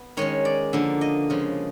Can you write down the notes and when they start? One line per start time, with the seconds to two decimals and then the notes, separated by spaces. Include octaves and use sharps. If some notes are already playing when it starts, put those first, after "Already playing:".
Already playing: B3
0.17 D#3 G#3 C#4 C#5
0.45 D5
0.73 D3 F3 A#3
1.01 D#5
1.30 C#3 F3 G#3